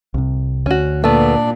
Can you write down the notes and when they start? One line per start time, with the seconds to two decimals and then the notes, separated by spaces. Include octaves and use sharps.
0.14 C2 C3
0.66 D2 C#4 F#4
1.04 A#2 A3 B3 D4 D5